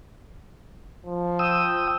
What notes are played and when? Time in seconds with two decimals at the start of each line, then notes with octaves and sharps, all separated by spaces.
1.06 F3
1.39 G5 D#6 E6